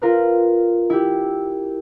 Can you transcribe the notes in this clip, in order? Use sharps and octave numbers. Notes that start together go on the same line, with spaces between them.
F4 A#4 B4
E4 G4